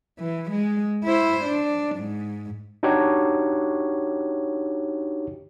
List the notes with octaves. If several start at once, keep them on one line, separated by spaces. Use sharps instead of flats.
E3
G#3
E4 C5
D4
G#2
D4 D#4 F#4 G4 C#5